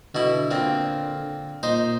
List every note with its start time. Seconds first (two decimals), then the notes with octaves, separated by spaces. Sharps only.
0.15 B2 D3 E4
0.51 A#2 C4
1.63 A#2 D#4 C5